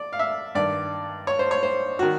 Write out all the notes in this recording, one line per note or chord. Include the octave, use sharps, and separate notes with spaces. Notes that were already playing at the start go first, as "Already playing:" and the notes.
Already playing: D5
F5
E5
G2 D#3 D5
C#5
C5
C#5
C5
D#3 F#4